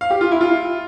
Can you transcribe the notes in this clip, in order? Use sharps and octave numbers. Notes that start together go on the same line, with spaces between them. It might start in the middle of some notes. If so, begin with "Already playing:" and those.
F5
G4
F4
E4
F4